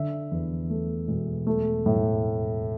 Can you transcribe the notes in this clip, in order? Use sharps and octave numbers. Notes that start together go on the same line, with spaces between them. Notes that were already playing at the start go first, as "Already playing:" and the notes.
Already playing: D3 E5
E2
A3
E1
A3
A2